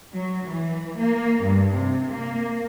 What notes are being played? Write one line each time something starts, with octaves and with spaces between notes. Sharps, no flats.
F#3
E3
A#3
G2
C3
A#3